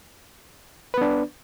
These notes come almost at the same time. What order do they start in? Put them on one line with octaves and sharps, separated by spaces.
B4 B3 D4